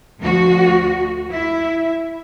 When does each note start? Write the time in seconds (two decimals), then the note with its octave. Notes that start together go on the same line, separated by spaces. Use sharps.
0.20 D2 F3 F#4
1.30 E4 E5